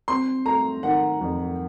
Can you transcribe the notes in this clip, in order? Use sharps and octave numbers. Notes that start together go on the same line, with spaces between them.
C4 C6
A3 A#5
D#3 F#5
F2